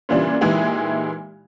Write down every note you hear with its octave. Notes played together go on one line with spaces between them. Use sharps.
A#2 C#3 E3 G3 D4 F4
A#2 E3 G#3 D#4 E4 G4